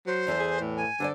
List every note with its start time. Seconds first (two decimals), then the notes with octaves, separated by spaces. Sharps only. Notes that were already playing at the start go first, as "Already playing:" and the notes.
0.06 F#3 C5
0.27 E2 E3 A4
0.39 G#4
0.60 A2
0.77 G#5
1.00 D3 A4 C5 D5